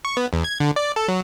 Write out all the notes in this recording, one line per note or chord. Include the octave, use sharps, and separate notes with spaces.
C#6
B3
E2
G#6
D3
D5
A4
F#3